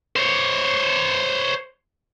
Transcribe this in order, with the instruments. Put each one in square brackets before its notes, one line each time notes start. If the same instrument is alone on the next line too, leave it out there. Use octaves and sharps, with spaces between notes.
[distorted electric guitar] C5 C#5